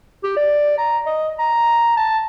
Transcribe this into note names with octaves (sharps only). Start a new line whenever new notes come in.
G4
D5
A#5
D#5
A#5
A5